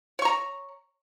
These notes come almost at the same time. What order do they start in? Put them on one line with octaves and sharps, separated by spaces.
C#5 C#6 A#5